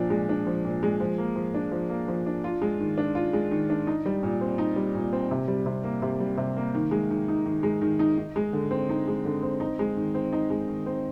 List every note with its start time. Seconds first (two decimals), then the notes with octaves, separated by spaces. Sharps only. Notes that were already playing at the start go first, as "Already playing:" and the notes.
Already playing: A#2 F3 D4
0.10 G#3
0.29 D4
0.46 F3
0.65 A#2
0.83 G#3
1.00 F3
1.18 A#3
1.36 F3
1.54 D4
1.71 F3
1.90 A#3
2.08 F3
2.26 D4
2.44 F4
2.62 G#3
2.80 D#3
2.98 D4
3.15 F4
3.33 G#3
3.51 D#3
3.70 D4
3.87 D#4
4.06 G3
4.23 A#2
4.41 C4
4.58 D#4
4.76 G3
4.95 A#2
5.13 C4
5.31 C3
5.48 G3
5.66 C3
5.84 A#3
6.02 C3
6.20 G3
6.37 C3
6.57 A#3
6.74 D#3
6.91 G#3
7.10 D#3
7.28 D#4
7.46 D#3
7.63 G#3
7.81 D#3
7.99 D#4
8.18 D#4
8.36 G#3
8.53 D3
8.71 C4
8.89 D#4
9.07 G#3
9.25 D3
9.43 C4
9.60 D#4
9.79 G#3
9.97 D#3
10.14 C4
10.33 D#4
10.50 G#3
10.68 D#3
10.86 C4